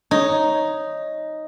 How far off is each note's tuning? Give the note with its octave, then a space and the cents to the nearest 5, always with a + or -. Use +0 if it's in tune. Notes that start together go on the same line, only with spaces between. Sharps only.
D#4 +0 C#5 +0